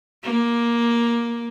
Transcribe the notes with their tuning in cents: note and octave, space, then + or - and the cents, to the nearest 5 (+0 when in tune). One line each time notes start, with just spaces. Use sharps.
A#3 +10